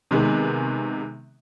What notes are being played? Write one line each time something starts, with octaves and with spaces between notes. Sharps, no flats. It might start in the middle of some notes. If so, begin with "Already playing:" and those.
C3 D#3 G#3 B3